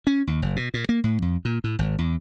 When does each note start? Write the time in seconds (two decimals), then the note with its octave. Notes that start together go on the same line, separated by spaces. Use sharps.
0.07 C#4
0.27 D#2
0.42 F#1
0.56 B2
0.74 A#2
0.89 A#3
1.04 A2
1.22 F2
1.45 A#2
1.64 A2
1.79 G#1
1.98 E2